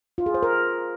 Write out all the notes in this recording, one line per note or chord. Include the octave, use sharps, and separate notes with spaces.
F4
G#4
C5
A#4